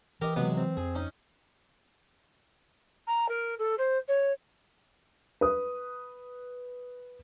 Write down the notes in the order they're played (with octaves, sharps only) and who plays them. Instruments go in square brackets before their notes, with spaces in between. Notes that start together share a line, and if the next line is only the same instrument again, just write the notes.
[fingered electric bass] E3 [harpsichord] G4 D#5 [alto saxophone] A#4
[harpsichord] C3 F#3 G#3 [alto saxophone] B3
[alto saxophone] C4
[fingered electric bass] F2 [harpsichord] G#4
[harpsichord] C#4 D#4
[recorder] A#5
A#4
A4
C5
C#5
[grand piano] B4 D#6